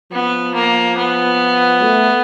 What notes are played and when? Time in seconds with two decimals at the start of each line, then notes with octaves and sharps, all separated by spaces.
0.12 F3 B3
0.54 A#3
0.97 B3
1.82 A3